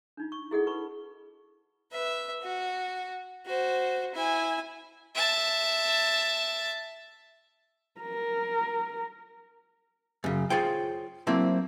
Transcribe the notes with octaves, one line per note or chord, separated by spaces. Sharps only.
D4 D#4 F4
C#6
E4 F#4 G#4 A4 D#5 F#5
B4 A5 B5 C#6
B4 E5
F#4
F#4 C5
E4 G#5
E5 A5
A#4
F#2 C#3
F4 G#4 C5 C#5 G5
F#3 A#3 C4 D4 E4 C5